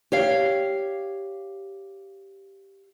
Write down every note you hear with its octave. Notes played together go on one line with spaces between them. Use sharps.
G4 C#5 F5